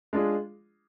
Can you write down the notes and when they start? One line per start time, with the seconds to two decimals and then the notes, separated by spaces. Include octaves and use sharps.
0.13 G#3 D4 F4 G#4